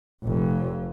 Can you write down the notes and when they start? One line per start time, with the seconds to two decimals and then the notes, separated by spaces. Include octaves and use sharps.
0.24 F1 F2